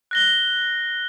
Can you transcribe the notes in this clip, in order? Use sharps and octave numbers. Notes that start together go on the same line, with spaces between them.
F#6 A#6 G7